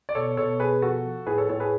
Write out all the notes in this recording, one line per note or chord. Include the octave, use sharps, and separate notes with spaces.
D5
B2 A4 C#5
B2 A4 C#5
B2 G#4 B4
F3 F#4 A4
F3
A2 G#4 B4
A4 C#5
A2 A4 C#5
G#4 B4